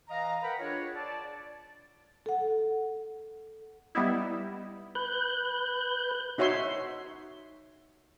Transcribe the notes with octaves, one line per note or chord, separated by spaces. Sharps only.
E3 D#5 F5 A#5
A#4 B4 F#5 G5 B5
D4 F4 G#4 C#5
D5 A5
A4 F#5
G3 B3 D#4 E4
B4 F#6 G6
D#4 F#4 C#5 E5 C6